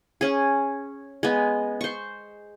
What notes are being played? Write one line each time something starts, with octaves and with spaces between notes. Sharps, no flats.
C#4 G#4
G#3 B3
C5 C#6